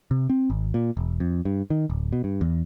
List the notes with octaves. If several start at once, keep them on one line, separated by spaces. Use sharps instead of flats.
C3
C4
G#1
A#2
E1
F2
G2
D#3
D1
B2
G2
E2